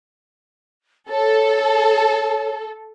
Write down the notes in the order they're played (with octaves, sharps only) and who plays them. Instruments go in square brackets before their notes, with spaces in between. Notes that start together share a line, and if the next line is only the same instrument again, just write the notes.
[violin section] A4 [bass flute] C#5